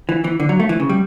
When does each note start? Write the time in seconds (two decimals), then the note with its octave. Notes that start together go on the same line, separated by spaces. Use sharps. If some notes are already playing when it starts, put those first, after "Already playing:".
0.09 E3
0.24 E3
0.40 D3
0.49 F#3
0.60 A3
0.69 E3
0.80 C#3
0.89 G3